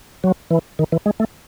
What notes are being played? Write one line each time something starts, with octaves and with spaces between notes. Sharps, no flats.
F#3
E3
D#3
E3
G#3
A3